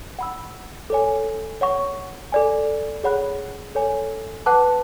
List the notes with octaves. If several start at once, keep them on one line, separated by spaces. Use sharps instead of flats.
F#5 B5 E6
A4 C#5 G#5
C#5 F#5 C#6
A4 D5 G#5
G#4 C#5 F#5 B5 F#6
A4 C#5 G#5
B4 F#5 A5 D6 F#6